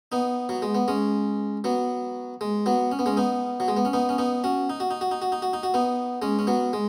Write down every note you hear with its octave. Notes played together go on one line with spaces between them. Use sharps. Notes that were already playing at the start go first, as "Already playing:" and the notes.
B3 D#4
F#3
G#3
B3
G#3 C#4
F#3 B3
G#3
F#3 B3
C#4
B3
G#3 C#4
B3 D#4
F#3
G#3
B3
C#4
B3 D#4
C#4
B3 D#4
C#4 F#4
D#4
F#4
D#4
F#4
D#4
F#4
D#4
F#4
D#4
F#4
B3 D#4
G#3 C#4
C#4
F#3 B3
G#3